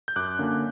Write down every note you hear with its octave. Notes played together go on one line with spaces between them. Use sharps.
G6
F#2 D6 F#6
D3 A#3 C#4